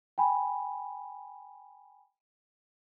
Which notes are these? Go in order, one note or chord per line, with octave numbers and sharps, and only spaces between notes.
G5 G#5 B5